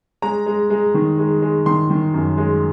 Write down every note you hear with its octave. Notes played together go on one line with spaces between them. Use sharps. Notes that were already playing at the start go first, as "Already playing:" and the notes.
G#3 A#5
G#3
G#3
D#3
G#3
G#3
D#3 C6
D#3
F#2
G#3